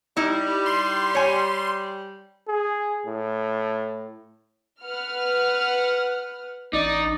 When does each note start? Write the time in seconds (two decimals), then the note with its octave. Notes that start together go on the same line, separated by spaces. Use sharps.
0.17 G3 D#4 E4
0.66 C6
1.15 C#5 G#5
2.48 G#4
3.06 A2
4.82 B4 F#5 F6
6.73 A1 D#4 D5